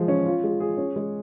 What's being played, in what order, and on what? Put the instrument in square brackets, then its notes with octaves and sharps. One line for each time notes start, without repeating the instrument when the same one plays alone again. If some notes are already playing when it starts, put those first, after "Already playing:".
Already playing: [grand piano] F3 G#3
C#4
F4
G#3
G#4
C#4
G#3